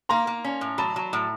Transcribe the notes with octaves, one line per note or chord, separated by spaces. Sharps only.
A#3 A#5 C6
A#3
C#4
A2
F#3 A5 B5
F#3
A2